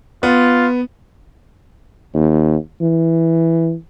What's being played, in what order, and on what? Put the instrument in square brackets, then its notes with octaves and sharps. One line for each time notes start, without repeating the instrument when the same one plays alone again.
[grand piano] B3 [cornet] F4
[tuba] D#2
E3